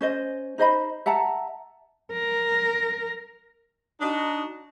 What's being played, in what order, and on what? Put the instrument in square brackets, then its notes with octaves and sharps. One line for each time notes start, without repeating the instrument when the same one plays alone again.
[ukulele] C#4 C5 D#5
D#4 C5 D#5 B5
E5 F#5 A5 A#5
[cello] A#4
[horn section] D4 D#4 F#4